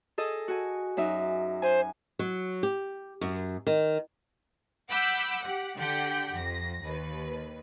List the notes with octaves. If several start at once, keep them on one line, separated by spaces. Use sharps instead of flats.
G#4 A4 D#5
F#4 G#5
F#2 D#4 E5
C5 G#5
F#3
G4
F#2
D#3
F#5 B5 D6 E6 F#6 G6
G4 F#5 F#6
D3 G4 F#5 G5 G6
F2 A#6
D#2 B4